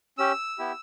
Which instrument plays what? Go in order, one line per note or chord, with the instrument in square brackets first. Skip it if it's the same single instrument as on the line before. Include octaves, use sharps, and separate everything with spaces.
[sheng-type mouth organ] C#4 G4 E6
B3 E4 G4